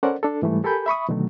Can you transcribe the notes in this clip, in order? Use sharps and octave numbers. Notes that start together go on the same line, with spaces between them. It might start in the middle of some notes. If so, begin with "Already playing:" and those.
C#4 A4 A#4 C5 D5 F#5
D4 A4
G#2 E3 G3 A3
G4 A4 A#4 G#5 B5 G6
E5 B5 C#6 D#6
B2 D3 D#3 F#3 A3